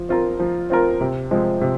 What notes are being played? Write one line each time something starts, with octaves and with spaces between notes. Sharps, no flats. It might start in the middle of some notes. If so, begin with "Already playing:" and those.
Already playing: F3
C4 F4 A#4
F3
C4 F4 A#4
C3
F3 G#3 C4
C3